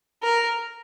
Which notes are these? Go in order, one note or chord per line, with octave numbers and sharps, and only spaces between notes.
A#4